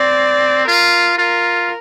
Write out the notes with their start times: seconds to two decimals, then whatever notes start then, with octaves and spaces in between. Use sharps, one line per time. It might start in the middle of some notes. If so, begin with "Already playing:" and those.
Already playing: C4 D5
0.68 F4 A#4
1.18 F4 A#4